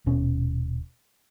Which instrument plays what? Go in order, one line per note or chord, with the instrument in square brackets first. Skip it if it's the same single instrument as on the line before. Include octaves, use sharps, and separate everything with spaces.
[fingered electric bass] D#1 B2 C#4